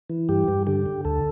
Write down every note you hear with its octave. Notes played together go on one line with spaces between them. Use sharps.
E3
G2 G4
G2
D3 G4
D3
D2 A4